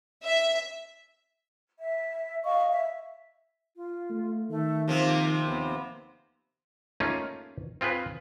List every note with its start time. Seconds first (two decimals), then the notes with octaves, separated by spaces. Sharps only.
0.24 E5
1.79 E5
2.45 D#5 F5 C#6
2.71 E5
3.76 F4
4.10 A3
4.50 D#3 A3
4.88 C3 F3 A#3 C4
5.46 D#2 B3
7.00 A3 A#3 C#4 D#4 F4 G#4
7.81 C4 F4 G#4 B4